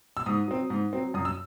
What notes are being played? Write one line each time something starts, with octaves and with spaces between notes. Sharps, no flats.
E6
G#2 D#6
F#3 C4
G#2
F#3 C4
F#2 D#6
E6